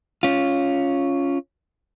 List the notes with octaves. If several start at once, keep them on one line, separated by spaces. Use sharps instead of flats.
C#4 F4